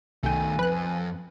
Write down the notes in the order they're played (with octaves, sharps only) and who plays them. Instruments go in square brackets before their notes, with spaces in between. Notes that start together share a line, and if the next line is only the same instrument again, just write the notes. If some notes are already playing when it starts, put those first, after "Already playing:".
[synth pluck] C2 G5 [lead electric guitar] D#3 A3 [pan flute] G#5
[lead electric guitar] F2 [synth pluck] B4 F#6